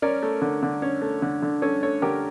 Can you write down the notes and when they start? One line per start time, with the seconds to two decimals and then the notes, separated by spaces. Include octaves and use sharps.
0.02 C#4 A#4 D5
0.22 A3
0.42 D3
0.63 D3
0.82 C#4
1.02 A3
1.22 D3
1.42 D3
1.62 C#4 A4 C#5
1.83 A3 A4 C#5
2.02 D3 G4 A#4